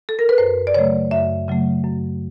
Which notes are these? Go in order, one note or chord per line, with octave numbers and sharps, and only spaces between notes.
A4
A#4
B4
F#2 C5
D5
C#3 F#3 A3 C#5
F#2 E5
C#3 F#3 A3
F#2